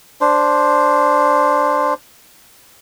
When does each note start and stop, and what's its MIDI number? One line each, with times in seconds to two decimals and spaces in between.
0.21 1.94 62
0.21 1.94 72